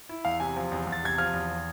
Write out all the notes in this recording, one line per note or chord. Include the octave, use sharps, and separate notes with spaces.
E4
E2 F5
C3 G#5
F3
E2
E2
A6
C3 G#6
F3 F6
E2